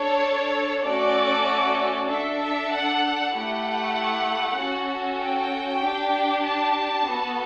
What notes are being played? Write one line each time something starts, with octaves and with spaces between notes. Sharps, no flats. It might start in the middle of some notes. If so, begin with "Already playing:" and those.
Already playing: D4 A4 C#5
A3 C#4 F#4 A4 D5
D4 A4 E5
E5
F#5
A3 E4 G4 F#5
C#4 F#4 A4
G5
D4 G4
A5
B3 F#4 A4